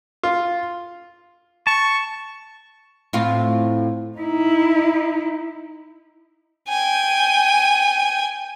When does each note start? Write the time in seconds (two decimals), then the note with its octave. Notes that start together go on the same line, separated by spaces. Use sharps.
0.24 F4
1.67 A5 C#6
3.13 A2 C4 F4
4.18 D#4 E4
6.68 G5 G#5